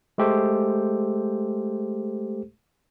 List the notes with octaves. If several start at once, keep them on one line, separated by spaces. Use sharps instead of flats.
G#3 A3 G4 A4 C5